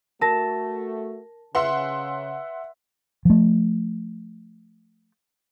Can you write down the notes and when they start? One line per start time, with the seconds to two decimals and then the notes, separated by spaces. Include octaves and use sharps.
0.21 A3 F#4 A#4 A5 A#6
1.55 C#3 B4 E5 F#5 C6
3.25 F3 A3